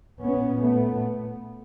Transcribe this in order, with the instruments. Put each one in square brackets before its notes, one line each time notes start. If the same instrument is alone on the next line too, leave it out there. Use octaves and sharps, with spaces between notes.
[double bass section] A#2 B3 C#4
A3 B3